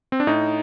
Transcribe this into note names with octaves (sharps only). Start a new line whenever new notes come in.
C4
D4
A2 D#4